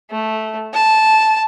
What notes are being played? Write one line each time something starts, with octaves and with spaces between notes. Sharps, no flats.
A3
A5